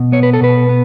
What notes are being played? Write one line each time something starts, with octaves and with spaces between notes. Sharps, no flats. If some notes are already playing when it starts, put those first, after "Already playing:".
Already playing: B2
B3 C#5
B4
A4
B2 B4
B3